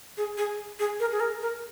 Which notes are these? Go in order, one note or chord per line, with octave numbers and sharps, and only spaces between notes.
G#4
G#4
G#4
A#4
G#4
A#4
A#4